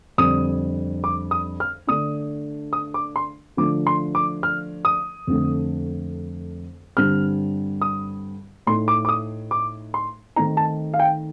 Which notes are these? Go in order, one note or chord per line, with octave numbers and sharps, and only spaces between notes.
F2 D3 G3 D4 D#6
D6
D#6
F6
D3 A3 D4 D#6
D#6
D6
C6
D3 F3 A3 D4 D6
C6
D6
F6
D#6
F2 D3 A3
G2 D3 G3 C4 F6
D#6
A2 A3 D#4 C6
D6
D6
D#6
D6
C6
D#3 A3 C4 D#4 A#5
A5
F5
G5